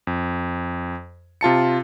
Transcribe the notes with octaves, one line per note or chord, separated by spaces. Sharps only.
F2
C3 F4 A5 C#7